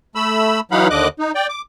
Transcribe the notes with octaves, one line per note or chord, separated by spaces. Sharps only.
A3 B5 E6
E3 F#3 D#4 F5 F#5 B5
D#2 D3 D#5 D6 F#6
D#4
D5 G5
D6